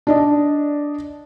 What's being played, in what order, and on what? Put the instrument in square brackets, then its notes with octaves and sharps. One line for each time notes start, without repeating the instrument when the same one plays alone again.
[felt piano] D4 D5 D#5